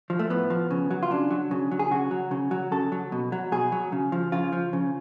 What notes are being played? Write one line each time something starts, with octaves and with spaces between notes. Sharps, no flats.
F3
A3
A2 B3
F3
C#3
F#3
F4
C#3 D4
F#3
C#3
F#3
G#4
C#3 F#4
F#3
C#3
F#3
C#3 A4
F#3
B2
F#3
B2 G#4
F#3
C#3
F3
C#3 F4
F3
C#3